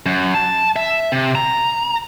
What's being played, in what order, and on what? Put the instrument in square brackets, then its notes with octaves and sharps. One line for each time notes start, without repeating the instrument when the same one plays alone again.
[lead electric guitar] F#2
A5
E5
C3
A#5